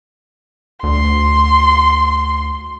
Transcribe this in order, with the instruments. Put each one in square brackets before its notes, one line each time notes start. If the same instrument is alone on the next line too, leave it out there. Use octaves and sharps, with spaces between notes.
[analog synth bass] D2 [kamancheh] C6